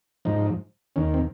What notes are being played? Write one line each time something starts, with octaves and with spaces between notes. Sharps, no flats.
G#2 F3 D#4
D#2 D#3 C#4
C4